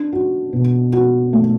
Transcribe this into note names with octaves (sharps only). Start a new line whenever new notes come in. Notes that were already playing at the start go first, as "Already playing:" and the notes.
Already playing: D4
F#4
B2
F#4
A3